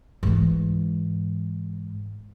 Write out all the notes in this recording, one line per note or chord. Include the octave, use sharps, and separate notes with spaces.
G#2 E3